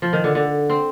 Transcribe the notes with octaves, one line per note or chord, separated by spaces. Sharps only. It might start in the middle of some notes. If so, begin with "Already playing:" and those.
F3
D#3
D3
D3
C4